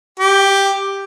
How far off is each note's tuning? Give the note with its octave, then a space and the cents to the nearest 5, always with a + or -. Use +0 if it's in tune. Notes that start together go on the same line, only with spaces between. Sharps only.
G4 +5